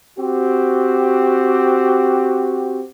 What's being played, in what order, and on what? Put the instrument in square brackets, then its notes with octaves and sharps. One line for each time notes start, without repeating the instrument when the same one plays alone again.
[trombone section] C4 F#4 G4